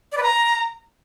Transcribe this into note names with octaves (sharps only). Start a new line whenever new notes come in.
D5
B4
A#5